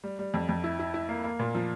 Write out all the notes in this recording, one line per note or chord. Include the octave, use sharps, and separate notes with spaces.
G3
G3
F2
F2
E4
E4
E4
A#3
A#3
A#2
F3